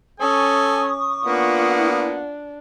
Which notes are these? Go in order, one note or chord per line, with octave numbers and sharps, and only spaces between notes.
C#4 A4 G#5 C#6 D#6
A#3 B3 D4 F4 F#5